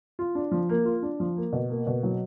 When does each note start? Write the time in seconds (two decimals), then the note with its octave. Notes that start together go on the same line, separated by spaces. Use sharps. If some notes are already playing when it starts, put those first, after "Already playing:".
0.19 F4
0.35 D4
0.51 F3
0.69 A#3
0.85 F4
1.03 D4
1.20 F3
1.37 A#3
1.52 B2
1.70 A#3
1.87 B2
2.03 F#3